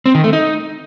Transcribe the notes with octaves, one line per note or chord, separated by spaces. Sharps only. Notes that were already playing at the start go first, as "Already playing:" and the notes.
C4
D#3
A3
D#4